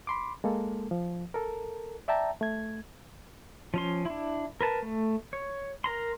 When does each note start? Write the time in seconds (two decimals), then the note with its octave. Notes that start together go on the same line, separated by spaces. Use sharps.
0.07 B5 C6 D6
0.44 G#3 A#3 A4
0.91 F3
1.34 A4 A#4
2.08 D5 E5 G5 A5 A#5
2.41 A3 G#6
3.74 F3 C#4 C6
4.05 D4 E4
4.61 A#4 B4 A5
4.82 A3
5.33 C#5
5.84 A#4 A#5 C6